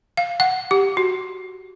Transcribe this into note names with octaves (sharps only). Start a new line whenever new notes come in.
F5
F#5
G4
F#4